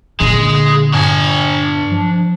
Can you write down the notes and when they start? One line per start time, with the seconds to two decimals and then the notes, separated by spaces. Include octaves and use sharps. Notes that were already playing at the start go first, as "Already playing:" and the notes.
0.20 A#2 D3 G#3
0.93 G2 D4 G#5
1.91 F3